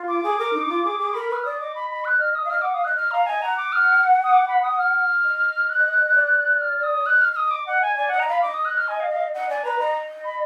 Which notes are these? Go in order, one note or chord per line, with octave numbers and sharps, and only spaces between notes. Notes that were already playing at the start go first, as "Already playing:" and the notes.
Already playing: F4
D6
G#4
A#4
D#4
F4
G#4
G#4
A#4 B5
B4 F6
D5 D#6
D#5 D6
B5
B5
F#6
F6
D#6
F5
D#5 F6
F#5 D6
F5 D#6
D#5 F#6
D#5 F6
F5 A#5
D#5 G#5
F#5 A#5
D6
F6
D#6
D6
B5
D#6
F6
D#5
F#6
D5
F6
D#6
D#5 F#6
F6
F6
D#6
D6
F#5
G#5
D#5
D5 G#5
D#5 F#5
D#5 A#5
F5 B5
D#5 D6
D#6
F#6
F6
G#5
F5
F5
D#5 F#5
D5 G#5
B4 A#5
D#5
B5